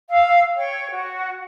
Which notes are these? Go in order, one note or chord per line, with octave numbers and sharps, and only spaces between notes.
F5 E6
C#5 G5
F#4